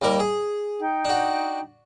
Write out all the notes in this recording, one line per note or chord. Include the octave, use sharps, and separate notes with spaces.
D#2 G3 A#4
G#4
D#4 G5
D4 F#4